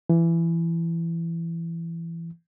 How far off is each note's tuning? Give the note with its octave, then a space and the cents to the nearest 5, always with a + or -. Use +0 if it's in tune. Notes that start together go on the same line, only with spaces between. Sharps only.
E3 +20